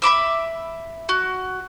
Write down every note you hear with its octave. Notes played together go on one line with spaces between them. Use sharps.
E5 B5 D6 E6
F#4